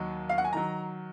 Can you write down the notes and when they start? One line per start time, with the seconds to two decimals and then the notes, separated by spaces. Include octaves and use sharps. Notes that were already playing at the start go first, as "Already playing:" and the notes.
Already playing: D#2 D#3 F#3
0.29 F5
0.38 F#5
0.44 G#5
0.53 D#3 F#3 A#5